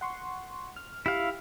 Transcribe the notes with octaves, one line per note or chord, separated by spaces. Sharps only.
F#5 C6 C#6
F6
E4 G4 F5